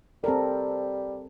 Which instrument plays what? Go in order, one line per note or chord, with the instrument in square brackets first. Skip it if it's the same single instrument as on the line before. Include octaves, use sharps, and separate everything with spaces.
[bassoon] G3 [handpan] C4 A4 A#4